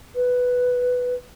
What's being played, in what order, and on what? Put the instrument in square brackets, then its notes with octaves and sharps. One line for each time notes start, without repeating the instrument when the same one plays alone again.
[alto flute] B4